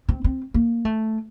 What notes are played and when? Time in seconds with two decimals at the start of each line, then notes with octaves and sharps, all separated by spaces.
0.09 C4
0.24 C4
0.54 A#3
0.85 A3